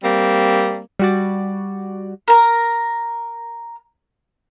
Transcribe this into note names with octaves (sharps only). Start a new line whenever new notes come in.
G3 A#3 C4
G3 F#4 D5
A#4 A#5